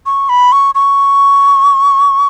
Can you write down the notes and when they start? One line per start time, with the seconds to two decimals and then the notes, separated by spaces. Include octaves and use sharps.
0.06 C#6
0.29 B5
0.52 C#6
0.75 C#6